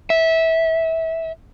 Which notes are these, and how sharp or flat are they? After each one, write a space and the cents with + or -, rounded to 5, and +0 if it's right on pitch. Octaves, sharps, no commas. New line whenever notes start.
E5 -20